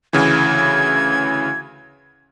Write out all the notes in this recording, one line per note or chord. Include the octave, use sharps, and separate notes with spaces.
D2 C#3 E3 G#6